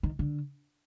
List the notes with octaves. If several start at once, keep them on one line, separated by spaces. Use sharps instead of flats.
D#3
D3